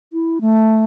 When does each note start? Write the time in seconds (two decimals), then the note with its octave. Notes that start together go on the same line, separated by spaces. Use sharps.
0.13 E4
0.41 A3